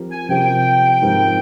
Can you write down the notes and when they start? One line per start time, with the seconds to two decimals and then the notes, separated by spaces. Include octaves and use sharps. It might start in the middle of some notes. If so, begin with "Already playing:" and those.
Already playing: F3 C4 G4 A#4
0.11 G#5
0.29 C3 F3 C4 G4 A#4 G5
1.02 G#2 F3 C4 G4 A#4